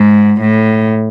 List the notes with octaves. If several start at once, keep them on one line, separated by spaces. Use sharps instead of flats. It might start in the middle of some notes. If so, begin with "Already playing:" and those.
Already playing: G#2
A2